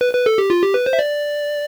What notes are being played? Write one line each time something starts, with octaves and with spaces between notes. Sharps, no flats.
B4
B4
A4
G4
F4
G4
B4
C5
E5
D5